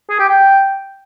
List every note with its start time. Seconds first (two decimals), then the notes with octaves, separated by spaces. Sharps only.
0.10 G#4
0.19 G4
0.29 G5